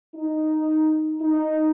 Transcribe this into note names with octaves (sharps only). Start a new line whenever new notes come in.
D#4
D#4